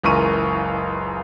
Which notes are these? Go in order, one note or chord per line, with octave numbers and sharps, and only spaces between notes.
F#1 C#2 E3 A#4 C#6 D#7